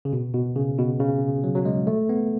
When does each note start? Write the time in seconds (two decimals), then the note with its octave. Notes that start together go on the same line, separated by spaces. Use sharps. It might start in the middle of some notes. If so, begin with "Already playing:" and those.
0.05 C#3
0.13 B2
0.34 B2
0.56 C#3
0.78 B2
1.00 C#3
1.44 F#3
1.55 F#3
1.65 G#3
1.87 A3
2.09 B3